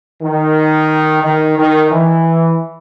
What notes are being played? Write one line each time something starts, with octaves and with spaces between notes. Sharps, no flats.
D#3
D#3
D#3
E3